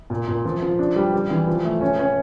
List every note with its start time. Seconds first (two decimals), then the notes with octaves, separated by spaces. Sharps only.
0.10 A#2
0.28 A#2
0.45 F3
0.62 F3
0.79 D4
0.96 G3
1.14 G3
1.31 E3
1.47 F3
1.64 A3
1.81 C#4
1.99 C#4